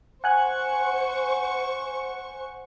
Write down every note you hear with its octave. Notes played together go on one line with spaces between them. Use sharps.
C5 F#5 G#5 C#6 F#6